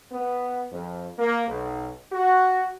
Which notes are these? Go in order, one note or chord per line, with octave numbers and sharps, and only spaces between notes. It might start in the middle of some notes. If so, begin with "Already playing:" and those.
B3
F2
A#3
B1
F#4